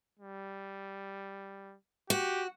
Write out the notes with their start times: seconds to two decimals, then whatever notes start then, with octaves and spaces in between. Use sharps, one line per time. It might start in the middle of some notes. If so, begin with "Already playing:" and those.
0.19 G3
2.10 F#4 G4